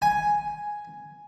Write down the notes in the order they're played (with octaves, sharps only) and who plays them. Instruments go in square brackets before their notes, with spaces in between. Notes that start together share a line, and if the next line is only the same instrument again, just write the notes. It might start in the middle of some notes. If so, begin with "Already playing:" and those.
[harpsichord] G#5